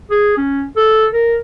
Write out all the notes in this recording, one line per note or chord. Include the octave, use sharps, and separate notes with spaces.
G#4
C#4
A4
A#4